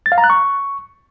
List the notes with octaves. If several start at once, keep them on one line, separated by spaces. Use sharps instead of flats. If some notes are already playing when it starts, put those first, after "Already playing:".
A6
F5
A#5
F#6
C#6